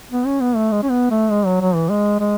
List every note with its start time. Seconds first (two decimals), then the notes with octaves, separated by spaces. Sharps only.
0.11 B3
0.26 C#4
0.41 B3
0.56 A3
0.71 G#3
0.83 C#4
0.90 B3
1.10 A3
1.30 G#3
1.46 F#3
1.61 F#3
1.75 E3
1.90 G#3
2.20 G#3